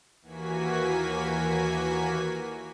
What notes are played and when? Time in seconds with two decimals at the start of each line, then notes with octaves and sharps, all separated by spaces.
0.21 D#2 E3 A#3 F#4 G#5 B6